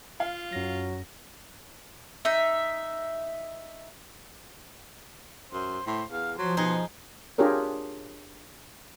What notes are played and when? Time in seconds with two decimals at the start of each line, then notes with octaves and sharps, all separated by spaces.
0.20 F4 F5
0.53 F#2 F#3 A#6
2.25 D#4 E5
5.53 F#2 C5
5.87 A2 C5
6.11 E2 F5
6.38 F3 F#3 C5
6.57 B2 D#4 G#4
7.38 D4 F4 G4 G#4 A#4 C#5